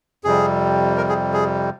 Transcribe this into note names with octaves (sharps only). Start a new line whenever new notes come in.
F2 C3 G3 G#4
A#4
G#4
G#4